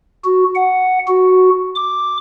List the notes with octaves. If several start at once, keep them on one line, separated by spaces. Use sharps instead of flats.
F#4
F#5
F#4
D6